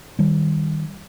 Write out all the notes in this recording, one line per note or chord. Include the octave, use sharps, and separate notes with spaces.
D#3 G3